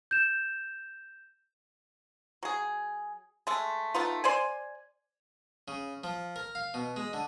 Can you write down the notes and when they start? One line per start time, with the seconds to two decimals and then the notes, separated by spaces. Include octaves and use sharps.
0.11 G6 E7
2.43 F#3 G#4
3.47 G#3 A3
3.94 A3 B3 D#4 F4
4.24 C5 D5 G#5
5.68 C#3
6.04 F3
6.36 A#4
6.55 F5
6.74 B2
6.96 G#3
7.13 D3